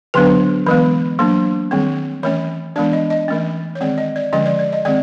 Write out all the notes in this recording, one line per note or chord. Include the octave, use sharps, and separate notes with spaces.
D3 F#3 B3 D4 B4
E3 G#3 B3 B4
F#3 A#3 D4
D#3 G3 C4
E3 A3 C#4 C#5
E3 G#3 B3 D4 D5
D#5
D#5
E3 A3 C#4
C#5
D#3 G#3 C4 D5
D#5
D5
D3 F3 G#3 C#4 D#5
D5
D5
D#5
D#3 G#3 C4 D5